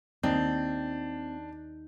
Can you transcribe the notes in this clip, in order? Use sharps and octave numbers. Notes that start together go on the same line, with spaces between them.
D#2 C4 D4 D#4 G6